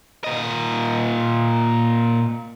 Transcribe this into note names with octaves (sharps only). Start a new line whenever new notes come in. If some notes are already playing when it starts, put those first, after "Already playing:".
A#2 D#5